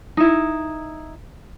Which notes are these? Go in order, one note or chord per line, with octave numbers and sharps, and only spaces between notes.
D#4 E4